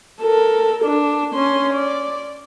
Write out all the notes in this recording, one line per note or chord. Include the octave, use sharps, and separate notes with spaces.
A4 A#4
D4
C#4 C6
D5